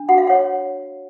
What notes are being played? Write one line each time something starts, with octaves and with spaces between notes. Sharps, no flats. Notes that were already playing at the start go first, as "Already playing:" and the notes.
Already playing: D4
F#4 F#5
F5
C#5 F#5